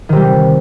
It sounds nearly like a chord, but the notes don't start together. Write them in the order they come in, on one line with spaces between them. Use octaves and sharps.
D#3 C3 G3